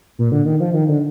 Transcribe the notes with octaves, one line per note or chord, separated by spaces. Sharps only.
A#2
D3
D#3
F3
D#3
D3